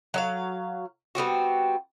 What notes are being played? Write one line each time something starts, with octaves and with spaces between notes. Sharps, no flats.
F#3 D#5 F5
G3 B3 C4 F#4